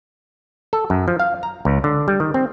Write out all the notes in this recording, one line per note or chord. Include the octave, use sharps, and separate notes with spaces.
A4
F#2
F3
F5
A#5
C#2
D3
G3
D#3
C4